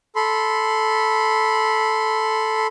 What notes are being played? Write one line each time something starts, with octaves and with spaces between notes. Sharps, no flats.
A4 B5 C6